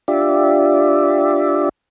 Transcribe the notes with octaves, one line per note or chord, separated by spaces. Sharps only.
D4 F4 G4 D5 E5